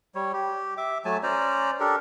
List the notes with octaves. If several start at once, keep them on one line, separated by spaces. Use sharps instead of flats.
G3 C#5
G4
E5 D6
F#3 A3 G#5 A5
C#4 C5 D5 A#5
D4 G4 A4 A#4